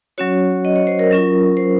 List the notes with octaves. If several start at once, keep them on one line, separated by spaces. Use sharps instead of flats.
F#3 C#4 F#4 C#5
D#5
C#5
C5
A#4
F#3 C#4 F4
C5